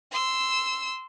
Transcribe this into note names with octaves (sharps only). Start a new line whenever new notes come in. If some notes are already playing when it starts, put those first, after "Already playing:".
C6 E6